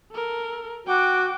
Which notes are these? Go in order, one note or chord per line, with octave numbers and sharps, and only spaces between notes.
A4 A#4
F#4 G5 D6